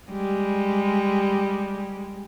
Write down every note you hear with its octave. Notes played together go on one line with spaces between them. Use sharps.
G3 G#3